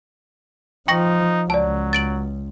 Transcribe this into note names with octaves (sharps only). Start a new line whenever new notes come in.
F3 D#4 G5 C#6 A#6
C#2 F#3 D5 A5
A6 D7 F#7